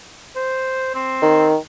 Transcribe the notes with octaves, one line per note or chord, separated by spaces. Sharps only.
C5
C4
D#3